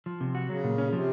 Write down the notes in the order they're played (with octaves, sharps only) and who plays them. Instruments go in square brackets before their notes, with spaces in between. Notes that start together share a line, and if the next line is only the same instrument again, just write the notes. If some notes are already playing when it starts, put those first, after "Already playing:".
[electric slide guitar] F3
C3
F#4
[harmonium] C#3 [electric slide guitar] F#3
[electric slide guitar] A#2
C#4
[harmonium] C3 [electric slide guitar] F3